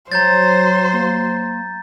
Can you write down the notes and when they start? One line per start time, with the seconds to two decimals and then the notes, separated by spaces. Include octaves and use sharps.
0.12 F#3 C5 C#5 A#5 G6 A6
0.93 A#3